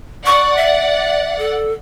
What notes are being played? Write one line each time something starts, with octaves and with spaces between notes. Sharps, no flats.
D5 F#5 C#6
E5
A4